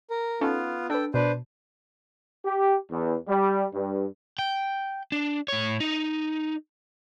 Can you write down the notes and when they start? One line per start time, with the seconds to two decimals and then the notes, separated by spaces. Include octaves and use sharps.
0.10 A#4
0.41 B3 C#4 D#4 F4 A4
0.90 D4 A4 B4 G5
1.14 B2 D4 B4 C5
2.46 G4
2.91 E2
3.29 G3
3.74 G2
4.39 G5
5.12 D4
5.48 A2 C#5
5.80 D#4